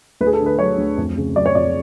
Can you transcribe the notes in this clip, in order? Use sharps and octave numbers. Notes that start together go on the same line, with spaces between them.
D2 B4
G#4
A4
D3
B4
F#3 C#5
D2
F2
C#3
F#3 D5
C#5
F2 D5